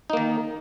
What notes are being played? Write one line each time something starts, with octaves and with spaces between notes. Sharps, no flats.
D#3 A#3 D#4